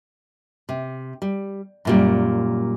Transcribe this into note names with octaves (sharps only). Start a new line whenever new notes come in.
C3
G3
F#2 A#2 G3